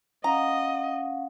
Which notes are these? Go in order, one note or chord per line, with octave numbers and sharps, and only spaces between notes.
C#4 D#5 F5 F#5 A#5